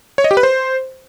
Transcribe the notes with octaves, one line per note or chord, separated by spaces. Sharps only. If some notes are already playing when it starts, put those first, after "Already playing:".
C#5
D#5
G4
B4
C5